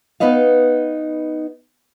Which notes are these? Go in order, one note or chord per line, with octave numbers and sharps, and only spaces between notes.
B3 D#4 B4 D#5 F5